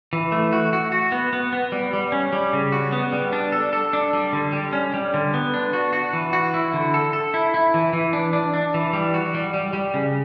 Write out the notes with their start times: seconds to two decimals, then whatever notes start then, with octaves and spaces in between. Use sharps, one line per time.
0.13 E3
0.32 A3
0.53 F#4
0.73 F#4
0.92 F#4
1.12 B3
1.33 B3
1.53 B3
1.72 G3
1.93 G3
2.12 C#4
2.33 G3
2.53 C#3
2.72 F#4
2.92 B3
3.12 G3
3.33 D4
3.52 A4
3.73 A4
3.93 D4
4.13 G3
4.33 D3
4.53 G3
4.73 C#4
4.94 G3
5.14 D3
5.34 B3
5.54 D4
5.73 F#4
5.93 F#4
6.13 E3
6.33 F#4
6.54 E4
6.73 D3
6.94 A4
7.13 A4
7.34 E4
7.54 E4
7.74 E3
7.93 E3
8.13 D4
8.33 D4
8.54 D4
8.74 E3
8.93 G3
9.14 F#4
9.34 G3
9.54 G3
9.73 G3
9.94 C#3